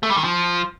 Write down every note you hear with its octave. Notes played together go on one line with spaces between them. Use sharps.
A3
G3
D#3
F3